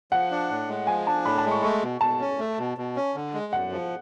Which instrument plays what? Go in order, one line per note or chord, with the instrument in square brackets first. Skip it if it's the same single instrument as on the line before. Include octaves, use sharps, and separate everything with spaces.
[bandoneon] F3 [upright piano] F#5
[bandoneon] D4
A2
G#3
[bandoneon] F3 [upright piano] G#5
[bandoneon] D4 [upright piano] A5
[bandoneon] A2 [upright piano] B5
[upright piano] A5
[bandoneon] G#3
[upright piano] C#6
[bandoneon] A3 [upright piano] C#6
[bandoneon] B2
[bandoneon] B2 [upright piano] A5
[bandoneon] C#4
A3
B2
B2
C#4
D3
G#3
[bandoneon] F#2 [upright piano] F#5
[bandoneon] F3